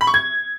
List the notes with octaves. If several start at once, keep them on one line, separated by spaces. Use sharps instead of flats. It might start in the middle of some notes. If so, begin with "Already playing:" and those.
B5
C#6
G#6